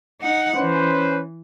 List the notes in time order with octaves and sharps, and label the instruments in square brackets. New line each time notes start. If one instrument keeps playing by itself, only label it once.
[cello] D#4 F#5
[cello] E3 [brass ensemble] C#4 B4 C5